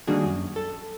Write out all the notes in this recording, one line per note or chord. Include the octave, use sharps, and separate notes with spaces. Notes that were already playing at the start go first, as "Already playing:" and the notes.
D#3 G3 A#3 D4 F#4 G#4
F#2
A4